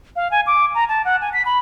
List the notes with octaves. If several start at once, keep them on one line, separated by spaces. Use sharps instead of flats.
F5
G#5
D6
A#5
A5
F#5
G#5
B6
B5